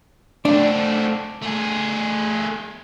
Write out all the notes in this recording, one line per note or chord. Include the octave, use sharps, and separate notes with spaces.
A3 C4 D4
A3 G#4